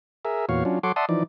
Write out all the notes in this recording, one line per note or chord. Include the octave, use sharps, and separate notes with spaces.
G#4 A#4 E5
E2 A#2 F#4 C#5 F5
F#3 C#4 D4 F4
F#3 A4 C#5 F#5 C6 D6
D5 E5 F#5 A5 C6 D#6
E3 F3 D#4 D5